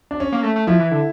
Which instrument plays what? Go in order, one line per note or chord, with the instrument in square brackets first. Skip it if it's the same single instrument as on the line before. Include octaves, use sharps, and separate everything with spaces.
[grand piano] D4
C#4
[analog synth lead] A#3
A3
A3
[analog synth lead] F3 [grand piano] E4
[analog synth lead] E3
D3